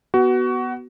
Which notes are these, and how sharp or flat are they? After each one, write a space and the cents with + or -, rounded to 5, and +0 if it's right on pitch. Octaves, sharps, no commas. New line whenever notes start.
B3 +0 F#4 +20